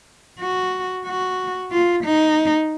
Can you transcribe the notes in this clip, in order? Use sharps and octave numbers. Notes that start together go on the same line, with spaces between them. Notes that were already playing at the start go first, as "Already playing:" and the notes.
F#4
F#4
F4
D#4